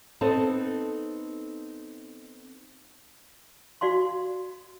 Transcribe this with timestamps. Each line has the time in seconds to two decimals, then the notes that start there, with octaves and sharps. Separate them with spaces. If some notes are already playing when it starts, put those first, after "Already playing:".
0.21 B3 C4 D#4 A4
3.81 F#4 D5 F5 C6